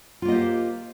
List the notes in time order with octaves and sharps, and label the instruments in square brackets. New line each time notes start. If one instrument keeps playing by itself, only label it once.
[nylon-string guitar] F4
A#3
D#5
C5
G4